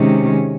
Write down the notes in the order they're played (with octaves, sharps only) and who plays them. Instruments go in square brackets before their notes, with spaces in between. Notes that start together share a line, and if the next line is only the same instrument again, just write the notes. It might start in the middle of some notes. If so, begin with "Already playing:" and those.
Already playing: [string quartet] C3 D#3 G#3 C#4